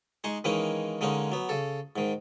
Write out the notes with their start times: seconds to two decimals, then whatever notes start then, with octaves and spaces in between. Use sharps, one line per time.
0.24 G#3 D#4 G#4 C#6
0.44 D#3 E3 G#3 A#3 C#4 D#4
1.01 D3 G#3 A#3 C#4 D#4
1.32 F#3 B3
1.49 C#3 A4
1.96 G#2 D#3